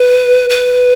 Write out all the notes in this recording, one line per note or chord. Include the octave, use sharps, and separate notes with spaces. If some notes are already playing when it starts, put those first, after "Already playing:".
Already playing: B4
B4